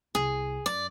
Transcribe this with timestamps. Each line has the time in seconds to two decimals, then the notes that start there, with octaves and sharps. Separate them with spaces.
0.15 C2 G#4
0.66 F#2 D5